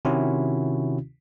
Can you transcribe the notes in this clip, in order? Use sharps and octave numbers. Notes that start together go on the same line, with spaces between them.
C3 D#3 C#4 E4 F#4